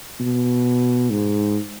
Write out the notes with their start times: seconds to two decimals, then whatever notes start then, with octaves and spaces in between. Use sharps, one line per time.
0.19 B2
1.10 G#2